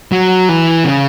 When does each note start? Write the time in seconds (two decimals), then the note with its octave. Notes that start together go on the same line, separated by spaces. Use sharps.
0.12 F#3
0.49 E3
0.85 C#3